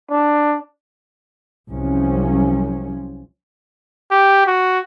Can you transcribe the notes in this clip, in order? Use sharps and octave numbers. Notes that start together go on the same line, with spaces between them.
D4
C2 F3 F#3 C#4
G4
F#4